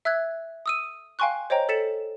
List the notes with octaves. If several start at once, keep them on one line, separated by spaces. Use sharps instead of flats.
E5 E6 F#6 G#6
D#6 E6 D#7
F5 G5 G#5 C6 C#6 F#6
C5 C#5 D#5 G5 A#5
A4 A6 B6 C#7 E7